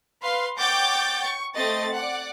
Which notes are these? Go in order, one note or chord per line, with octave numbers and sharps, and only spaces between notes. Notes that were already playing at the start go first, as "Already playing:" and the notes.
B4 F5 C6
C#5 F#5 G5 D6 G6 A6
C#6
A3 C4 D#5 A6
D5 F#5